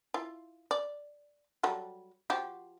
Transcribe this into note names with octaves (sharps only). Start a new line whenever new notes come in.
E4 F4
D5
F#3 G3 A4
F3 F#4 G4